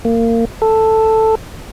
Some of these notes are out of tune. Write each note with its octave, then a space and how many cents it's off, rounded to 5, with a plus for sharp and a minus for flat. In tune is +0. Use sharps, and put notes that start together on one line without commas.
A#3 -25
A4 +5